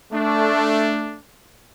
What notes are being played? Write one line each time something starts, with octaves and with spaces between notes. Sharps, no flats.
A3 D4